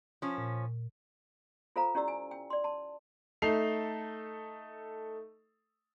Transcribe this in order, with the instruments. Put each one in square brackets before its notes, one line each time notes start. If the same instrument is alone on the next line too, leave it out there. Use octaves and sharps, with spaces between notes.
[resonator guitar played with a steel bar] F3 C#4
[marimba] A#2
[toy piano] F4 A4 C5 F5 A#5
C#4 E4 G4 D5 E6
G#5
G5
D5 C6
A5 C6
[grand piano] A3 D#4 A4 C7 F7